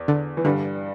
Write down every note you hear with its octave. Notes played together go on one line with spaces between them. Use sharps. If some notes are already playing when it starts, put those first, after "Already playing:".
Already playing: E2
D3
E3
G2 D3 G3